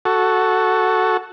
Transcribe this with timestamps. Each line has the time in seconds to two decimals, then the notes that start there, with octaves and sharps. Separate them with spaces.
0.05 F#4 A4